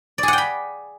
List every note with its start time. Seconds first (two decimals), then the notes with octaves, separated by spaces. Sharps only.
0.18 D5
0.23 G#4
0.28 F#5
0.33 G5
0.38 B5